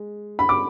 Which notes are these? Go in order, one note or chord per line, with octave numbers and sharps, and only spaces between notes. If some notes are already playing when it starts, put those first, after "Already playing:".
Already playing: G#3
B5
D6